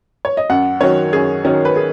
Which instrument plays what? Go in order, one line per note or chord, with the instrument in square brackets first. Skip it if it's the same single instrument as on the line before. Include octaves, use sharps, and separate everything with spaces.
[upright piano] C#5
D#5
F#2 F#5
D#3 F#3 C#4 C#5
F#2 G#4
D#3 F#3 C#4
B4
G#4